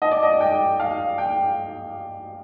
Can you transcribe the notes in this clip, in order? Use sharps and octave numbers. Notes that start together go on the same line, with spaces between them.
D#5
D5
D#5
G5
F5
G5